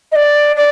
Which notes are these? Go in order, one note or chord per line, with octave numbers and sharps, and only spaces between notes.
D#5
D5
D5